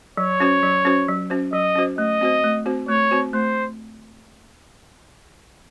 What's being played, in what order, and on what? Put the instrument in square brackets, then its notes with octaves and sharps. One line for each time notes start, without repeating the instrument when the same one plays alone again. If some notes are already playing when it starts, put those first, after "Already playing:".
[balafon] F#3 [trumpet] C#5
[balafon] C#4 F#4 C5
F#3
C#4 F#4 C5
F#3
C#4 F#4 C5
[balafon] F#3 [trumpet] D#5
[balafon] C#4 F#4 C5
[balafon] A3 [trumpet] D#5
[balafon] C4 F#4 C5
A3
C4 F#4 C5
[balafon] A3 [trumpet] C#5
[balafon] C4 F#4 C5
[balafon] A3 [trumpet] C5